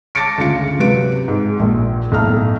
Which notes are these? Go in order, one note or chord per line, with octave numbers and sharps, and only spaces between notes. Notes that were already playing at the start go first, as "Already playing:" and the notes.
A5 D6 A6 A#6 C#7 D7
D2 C#3 F4 C#7
C3 F#3 G4 B4 D7
G#2
A#1 A#2
B1 A2 A#5 F6